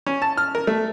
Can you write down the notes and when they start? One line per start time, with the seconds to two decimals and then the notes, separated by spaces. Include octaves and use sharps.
0.07 C#4
0.22 A5
0.37 F6
0.55 A#4
0.67 A3